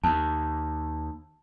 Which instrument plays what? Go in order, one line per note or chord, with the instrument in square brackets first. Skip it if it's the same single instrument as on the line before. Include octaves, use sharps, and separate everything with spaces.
[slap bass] D#2 [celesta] A5